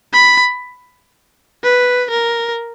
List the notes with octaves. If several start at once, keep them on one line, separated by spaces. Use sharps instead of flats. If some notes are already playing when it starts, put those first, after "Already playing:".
B5
B4
A#4